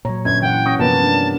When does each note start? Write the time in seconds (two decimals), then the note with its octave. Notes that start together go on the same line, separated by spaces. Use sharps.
0.05 A#2 F#3 C#5 A#5
0.25 G1 C#4 G#6
0.42 E3 F#5 G5
0.66 C#4 C#6 D#6 A#6
0.79 G2 C3 F3 A#3 B3 B4 A5
1.04 D4